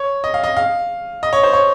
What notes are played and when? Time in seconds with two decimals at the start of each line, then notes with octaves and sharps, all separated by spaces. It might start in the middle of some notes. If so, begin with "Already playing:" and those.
Already playing: C#5
0.24 D#5
0.34 F5
0.44 D#5
0.57 F5
1.23 D#5
1.33 C#5
1.43 C5
1.53 C#5